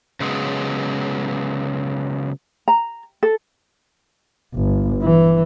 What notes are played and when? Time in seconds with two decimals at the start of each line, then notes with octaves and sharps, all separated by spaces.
0.20 C#3 F#3 G#3 B3
2.68 A#5
3.23 A4
4.55 G1
5.03 E3